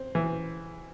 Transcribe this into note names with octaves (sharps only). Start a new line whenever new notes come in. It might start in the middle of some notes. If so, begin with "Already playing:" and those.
Already playing: C4
E3